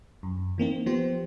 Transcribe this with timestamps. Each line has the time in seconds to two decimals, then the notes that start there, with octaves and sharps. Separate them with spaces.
0.23 F#2
0.58 E3 A#3 C4 D#4
0.86 F3 B3 G4 C5